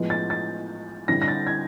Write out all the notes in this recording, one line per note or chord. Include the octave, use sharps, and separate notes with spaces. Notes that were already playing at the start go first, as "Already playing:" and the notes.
Already playing: A2 F3 G#3 B3
A6
A6
D3 G3 C4 E4 A#6
A#6
A6
G#6